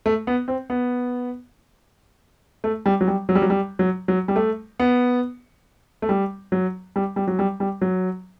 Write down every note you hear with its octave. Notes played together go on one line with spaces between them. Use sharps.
A3
B3
C4
B3
A3
G3
F#3
G3
F#3
G3
F#3
G3
F#3
F#3
G3
A3
B3
A3
G3
F#3
G3
G3
F#3
G3
G3
F#3